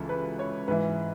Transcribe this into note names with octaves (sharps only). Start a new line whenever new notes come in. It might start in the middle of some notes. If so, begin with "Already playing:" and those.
Already playing: C#2 C#3 E3 A4
B4
C#5
G#2 E3 B4